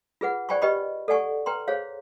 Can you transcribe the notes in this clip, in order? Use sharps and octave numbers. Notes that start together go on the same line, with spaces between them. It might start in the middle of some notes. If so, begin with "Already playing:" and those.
F4 G#4 B4 F#5
C5 D5 G5 G#5 B5 C#6
G4 B4 D#5 G5 B5 C#6
A4 D5 F#5 G#5 C#6
B4 G5 A#5 C6
G#4 C5 C#5 F5